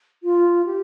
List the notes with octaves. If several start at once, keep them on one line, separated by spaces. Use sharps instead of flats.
F4
G4